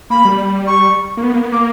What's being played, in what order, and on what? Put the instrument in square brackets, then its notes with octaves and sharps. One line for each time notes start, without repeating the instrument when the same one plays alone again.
[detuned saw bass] A#3 [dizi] B5
[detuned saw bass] G3
[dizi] C#6
[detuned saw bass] A#3
B3
A#3
B3
[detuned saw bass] A#3 [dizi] D6